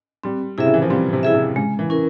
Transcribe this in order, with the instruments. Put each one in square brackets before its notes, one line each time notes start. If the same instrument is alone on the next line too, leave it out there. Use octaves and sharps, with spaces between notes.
[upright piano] G3 [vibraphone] C4
[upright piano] C3 [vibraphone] E4 G#4 E5
[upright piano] C#3
E3
F3
[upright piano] G3 [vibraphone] C4
[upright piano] C3
[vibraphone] E4 G#4 E5
[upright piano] C3
[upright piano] C#3 [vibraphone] G#3
[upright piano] E3
[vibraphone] C#4 E4 A#4